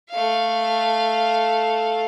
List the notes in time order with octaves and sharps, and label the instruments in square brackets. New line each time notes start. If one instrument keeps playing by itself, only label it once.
[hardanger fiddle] A3 F5